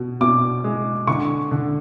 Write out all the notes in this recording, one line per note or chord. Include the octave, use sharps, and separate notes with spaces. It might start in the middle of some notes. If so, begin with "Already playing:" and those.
Already playing: B2
B2 D6
G#3
D3 C#6
D3